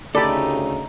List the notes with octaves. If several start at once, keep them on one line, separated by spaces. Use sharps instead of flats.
D2 C#3 A3 D#4 G4 A4 D5 B5